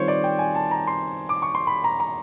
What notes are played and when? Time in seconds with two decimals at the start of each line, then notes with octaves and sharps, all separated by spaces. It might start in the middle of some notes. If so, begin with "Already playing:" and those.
Already playing: D#3 G3 C4 F4 C5 C#5
0.08 D5
0.24 G5
0.39 G#5
0.55 A5
0.71 A#5
0.87 C6
1.29 D6
1.42 C#6
1.55 C6
1.67 B5
1.84 A#5
2.00 A#5